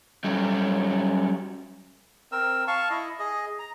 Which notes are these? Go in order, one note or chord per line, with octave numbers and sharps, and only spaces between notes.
F#3 G3 C#4 A4
C4 A#4 E6
F5 A5 C#6
E4 D#5
G#4 D#5
A#5